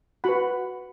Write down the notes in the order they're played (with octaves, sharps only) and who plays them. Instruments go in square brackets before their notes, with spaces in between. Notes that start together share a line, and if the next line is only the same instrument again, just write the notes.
[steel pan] F#4 B4 F#5 B5